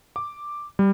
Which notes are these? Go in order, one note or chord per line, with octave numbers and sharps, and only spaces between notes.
D6
G3